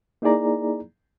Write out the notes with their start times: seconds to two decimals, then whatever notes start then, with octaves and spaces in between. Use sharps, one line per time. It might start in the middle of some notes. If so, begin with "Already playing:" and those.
0.22 A#3 D#4 E4 G#4 D5 A#5